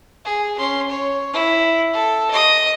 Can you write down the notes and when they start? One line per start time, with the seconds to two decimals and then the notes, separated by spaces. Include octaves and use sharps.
0.25 G#4
0.58 C#4 C6
0.89 C#5
1.33 E4
1.93 A4
2.30 D#5 D#6